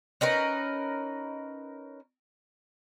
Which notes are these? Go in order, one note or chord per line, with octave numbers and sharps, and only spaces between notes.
C#4 D#4 A#4 B4